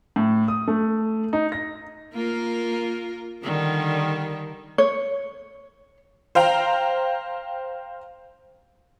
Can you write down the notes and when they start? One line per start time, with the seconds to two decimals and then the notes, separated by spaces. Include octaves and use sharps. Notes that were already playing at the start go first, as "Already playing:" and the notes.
0.16 A2
0.48 D#6
0.68 A3
1.33 D#4
1.52 A#6
2.14 A#3 F4 A#4
3.43 D3 D#3 G3
4.78 C#5
6.35 C5 F5 G5 A#5